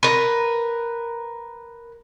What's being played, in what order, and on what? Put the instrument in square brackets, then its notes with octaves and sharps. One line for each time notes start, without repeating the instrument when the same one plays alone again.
[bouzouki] A#4 B4